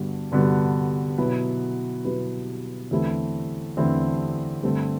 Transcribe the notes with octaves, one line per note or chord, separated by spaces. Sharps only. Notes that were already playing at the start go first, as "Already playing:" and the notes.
Already playing: G2 D3 G3 B3 F#4
G2 D3 G3 B3 F#4
B2 F#3 B3 E4 B4
B2 F#3 B3 E4 B4
E2 D3 A3 C4 E4
E2 D3 A3 C4 E4
G2 D3 A3 C4